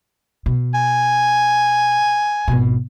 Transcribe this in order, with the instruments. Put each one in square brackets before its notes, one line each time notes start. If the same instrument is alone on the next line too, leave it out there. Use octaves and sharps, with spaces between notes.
[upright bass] B2
[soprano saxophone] G#5
[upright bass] G#1 B2